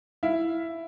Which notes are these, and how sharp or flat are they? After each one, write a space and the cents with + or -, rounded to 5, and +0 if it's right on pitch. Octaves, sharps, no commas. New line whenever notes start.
E4 +5 F5 +0